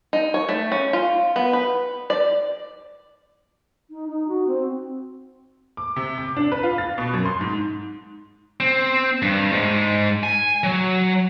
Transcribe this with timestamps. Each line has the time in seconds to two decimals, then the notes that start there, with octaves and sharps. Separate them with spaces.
0.13 D#4
0.34 C#5
0.49 A3
0.72 C#4
0.93 F4
1.36 B3
1.53 B4
2.10 D5
3.90 D#4
4.08 D#4
4.28 F#4
4.47 C4
5.77 D6
5.96 C3
6.18 D6
6.37 D4
6.52 B4
6.63 F4
6.78 A6
6.98 B2
7.13 F#2
7.25 C6
7.41 G#2
8.60 C4
9.22 G2
9.52 G#2
10.23 G#5
10.64 F#3